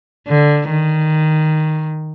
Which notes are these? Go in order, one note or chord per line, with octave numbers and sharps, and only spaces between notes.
D3
D#3